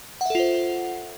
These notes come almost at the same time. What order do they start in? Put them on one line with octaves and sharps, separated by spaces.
F#5 E5 A4 F4 C5